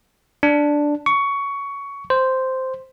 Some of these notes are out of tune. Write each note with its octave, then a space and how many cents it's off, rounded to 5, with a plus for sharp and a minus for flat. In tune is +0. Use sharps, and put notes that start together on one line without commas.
D4 +0
C#6 +15
C5 -5